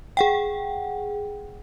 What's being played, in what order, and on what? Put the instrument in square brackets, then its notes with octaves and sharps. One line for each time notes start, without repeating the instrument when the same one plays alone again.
[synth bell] G#4 F#5 G5